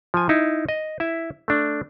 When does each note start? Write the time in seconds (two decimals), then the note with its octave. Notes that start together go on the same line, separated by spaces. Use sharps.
0.14 F3 G#5
0.29 D#4 E4
0.69 D#5
1.00 E4 E5
1.48 A3 D4